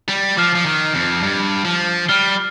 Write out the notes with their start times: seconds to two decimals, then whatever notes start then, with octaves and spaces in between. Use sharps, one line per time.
0.09 G3
0.37 F3 D6 F6 C7
0.55 F3
0.66 D#3
0.95 F2
1.23 G2
1.65 F3
2.08 G3 F6 C7 G7